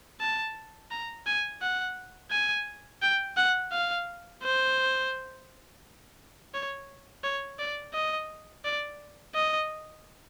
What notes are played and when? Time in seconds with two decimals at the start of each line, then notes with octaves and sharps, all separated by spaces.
0.20 A5
0.91 A#5
1.27 G#5
1.62 F#5
2.31 G#5
3.02 G5
3.37 F#5
3.72 F5
4.43 C5
6.54 C#5
7.24 C#5
7.59 D5
7.94 D#5
8.65 D5
9.35 D#5